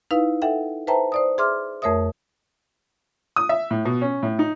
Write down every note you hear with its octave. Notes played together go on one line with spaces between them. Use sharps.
D#4 E4 B4 F5
A4 E5 F#5 G5
B4 C5 E5 G5 A5 A#5
C5 D5 D#6
G#4 E5 C6 D6 F6
F2 A3 A#4 C#5 E5 D#6
D#6
E5
A2
B2
C#4
A2
D#4